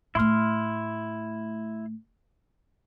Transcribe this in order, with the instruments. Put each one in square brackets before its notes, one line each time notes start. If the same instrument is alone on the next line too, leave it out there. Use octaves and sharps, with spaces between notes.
[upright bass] A2 A3 [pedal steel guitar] E4 C6 F6